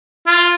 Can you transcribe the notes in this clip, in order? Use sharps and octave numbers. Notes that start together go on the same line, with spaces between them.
F4